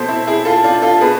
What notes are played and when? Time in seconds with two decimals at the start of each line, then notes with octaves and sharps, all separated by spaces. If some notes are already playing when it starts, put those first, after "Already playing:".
Already playing: B2 A4 C5
0.09 C4 E4
0.27 E4 G#4
0.45 F4 A4
0.64 D4 F4
0.82 F4 A4
1.01 B2 G#4 B4